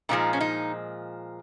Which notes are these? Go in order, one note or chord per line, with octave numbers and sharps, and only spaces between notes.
A#2 F3 G#3 D#4
C#4
D#4